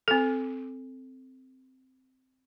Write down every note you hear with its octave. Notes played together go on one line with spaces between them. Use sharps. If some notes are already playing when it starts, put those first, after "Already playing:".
C4 A4